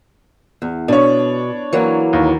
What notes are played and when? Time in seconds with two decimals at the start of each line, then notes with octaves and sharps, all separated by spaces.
0.62 E2
0.88 B2 D4 C#5
1.73 E3 F#3 A#3
2.13 D#2